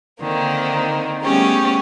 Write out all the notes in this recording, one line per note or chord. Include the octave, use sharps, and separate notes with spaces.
D3 D#3 A#3 C4
G3 A3 B3 C#4 G4 G#4